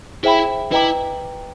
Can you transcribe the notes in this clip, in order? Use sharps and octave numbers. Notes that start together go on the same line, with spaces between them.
E4 G#4 C5 E5 G5 B5
E4 B4 D#5 G5 A#5 D6